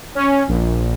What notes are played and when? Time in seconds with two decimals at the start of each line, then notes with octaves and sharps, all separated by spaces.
0.15 C#4
0.48 A#1